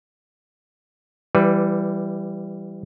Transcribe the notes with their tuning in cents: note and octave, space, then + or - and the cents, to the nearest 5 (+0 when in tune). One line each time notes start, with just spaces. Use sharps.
E3 +20 G3 +0 B4 +0